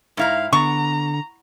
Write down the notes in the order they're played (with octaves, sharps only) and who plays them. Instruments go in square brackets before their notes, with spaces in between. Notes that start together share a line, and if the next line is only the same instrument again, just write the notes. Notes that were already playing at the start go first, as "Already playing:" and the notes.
[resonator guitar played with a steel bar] G#2 E4 A#5 [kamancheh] F5
[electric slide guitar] D3 [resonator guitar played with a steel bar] B3 [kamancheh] A#5 [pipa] C#6